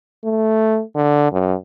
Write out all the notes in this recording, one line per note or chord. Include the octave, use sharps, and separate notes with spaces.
A3
D3
F#2